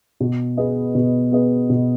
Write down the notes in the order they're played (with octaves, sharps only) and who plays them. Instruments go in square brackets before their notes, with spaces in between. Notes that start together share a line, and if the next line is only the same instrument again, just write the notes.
[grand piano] B2
B3 G#4 B4 D#5
B2
B3 G#4 B4 D#5
B2